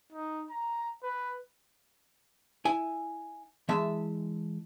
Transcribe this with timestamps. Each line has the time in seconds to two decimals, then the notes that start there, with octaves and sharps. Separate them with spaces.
0.12 D#4
0.50 A#5
1.03 B4
2.65 E4 G#5
3.69 E3 G#3 E5 A5